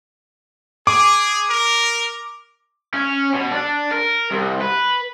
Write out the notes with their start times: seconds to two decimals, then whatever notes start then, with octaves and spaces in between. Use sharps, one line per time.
0.87 G#4 D6
1.50 A#4
2.93 C#4
3.34 B2
3.52 D4
3.92 A#4
4.31 C2
4.60 B4